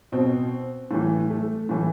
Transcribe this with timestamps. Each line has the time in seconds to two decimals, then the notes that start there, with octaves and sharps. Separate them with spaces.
0.12 B2 C4
0.91 A2 E3
1.30 A3
1.69 A2 E3